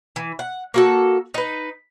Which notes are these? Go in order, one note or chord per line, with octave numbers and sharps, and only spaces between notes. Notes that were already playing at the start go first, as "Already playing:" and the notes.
E3
F#5
A#3 F#4 A4
D#4 B4